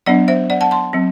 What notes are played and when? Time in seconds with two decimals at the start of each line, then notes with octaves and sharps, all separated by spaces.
0.06 F#3 B3 D4 D5 F#5
0.28 C5 E5
0.50 D5 F#5
0.61 F#5 A5
0.71 A5 C6
0.93 F#3 C4